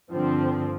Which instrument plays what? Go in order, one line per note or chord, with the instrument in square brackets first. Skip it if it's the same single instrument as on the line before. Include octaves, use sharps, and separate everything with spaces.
[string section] G2 D3 F3 C4